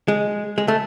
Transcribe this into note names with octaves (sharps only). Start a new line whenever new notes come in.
G#3
G#3
A3